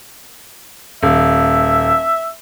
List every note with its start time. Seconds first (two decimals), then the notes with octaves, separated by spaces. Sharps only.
1.03 D#1 E5